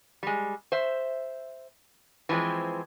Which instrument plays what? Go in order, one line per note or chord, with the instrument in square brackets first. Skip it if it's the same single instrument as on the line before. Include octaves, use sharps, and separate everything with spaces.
[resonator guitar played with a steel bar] G3 G#3
C5 E5
E3 F3 G3 G#3 C4